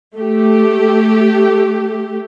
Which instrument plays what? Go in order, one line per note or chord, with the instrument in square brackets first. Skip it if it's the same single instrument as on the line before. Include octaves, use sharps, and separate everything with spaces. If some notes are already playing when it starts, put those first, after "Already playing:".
[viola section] A3 G4